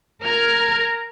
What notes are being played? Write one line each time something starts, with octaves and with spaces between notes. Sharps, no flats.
A#4 A#5 F6 G#6